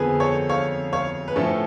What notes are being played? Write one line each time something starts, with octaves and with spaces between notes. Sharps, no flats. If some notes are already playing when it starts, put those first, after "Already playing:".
Already playing: F2 D3 F3 B3 G#4 B4
A4 C#5
C#5 F5
C#5 F5
B4
A2 F3 A3 C#4 A4 C#5